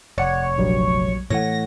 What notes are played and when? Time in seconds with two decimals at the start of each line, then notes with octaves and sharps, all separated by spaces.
0.18 F1 C#5 D5 F#5
0.58 A#1 F#3 G3
1.30 A2 E3 A3 C#5 F#5 A#6